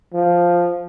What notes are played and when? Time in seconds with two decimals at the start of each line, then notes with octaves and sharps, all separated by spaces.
0.13 F3